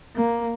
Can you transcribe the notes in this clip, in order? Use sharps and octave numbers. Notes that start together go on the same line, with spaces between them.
A#3